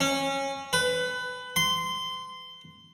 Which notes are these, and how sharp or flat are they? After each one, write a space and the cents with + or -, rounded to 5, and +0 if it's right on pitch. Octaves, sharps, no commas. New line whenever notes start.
C#4 -20
B4 +20
C6 -15